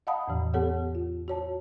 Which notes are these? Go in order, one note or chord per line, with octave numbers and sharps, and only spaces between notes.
D#5 F5 F#5 A5 B5 D#6
E2 A2 E3
B3 G4 A4 C#5 F#5
F4
F#4 C#5 A5